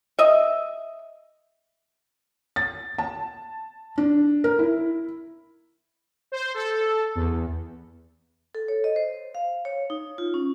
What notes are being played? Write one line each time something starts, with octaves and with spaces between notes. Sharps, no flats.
D#5 E5
A6
A5
D4
A#4
E4
C5
A4
E2
A4
C#5
D#5
C5
F5
C#5
D#4
F4
C#4